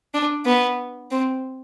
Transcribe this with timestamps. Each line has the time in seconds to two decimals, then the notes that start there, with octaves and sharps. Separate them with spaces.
0.14 D4
0.46 B3
1.11 C4